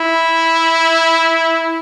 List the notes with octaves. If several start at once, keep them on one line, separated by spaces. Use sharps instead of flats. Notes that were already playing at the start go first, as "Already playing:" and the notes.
Already playing: E4